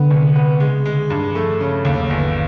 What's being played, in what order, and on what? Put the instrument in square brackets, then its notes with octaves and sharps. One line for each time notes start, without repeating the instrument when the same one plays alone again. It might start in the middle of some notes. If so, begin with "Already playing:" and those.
Already playing: [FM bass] D3 [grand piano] B3
[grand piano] C2
B3
[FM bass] C#3 [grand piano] G#3
[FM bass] D3 [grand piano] G#3
[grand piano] G2 [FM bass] D#3
[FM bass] F3 [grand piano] A3
[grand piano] C#3
D#2
G1